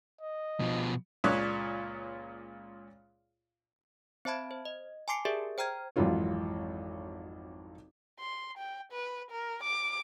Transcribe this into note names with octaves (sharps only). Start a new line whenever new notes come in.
D#5
B2 F3
C#2 A#2 C#5 D5 F#6
C4 C5 E5 A5 B5 G#6
C5
D#5
G#5 A5 C6 D6 C7 C#7
G4 G#4 A#4 D5 E5
C5 G5 A#5 F6 G#6
G#1 F2 E3 F#3 F4 C#5
C6
G5
B4
A#4
D6